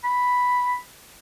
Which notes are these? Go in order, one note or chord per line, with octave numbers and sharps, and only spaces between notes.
B5